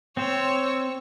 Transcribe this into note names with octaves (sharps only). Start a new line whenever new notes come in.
C4 C5 C#5 E6